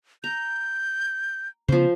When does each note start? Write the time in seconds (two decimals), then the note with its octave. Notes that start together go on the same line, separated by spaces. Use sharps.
0.24 A#5 G6
1.68 C#3 F3 B3 C5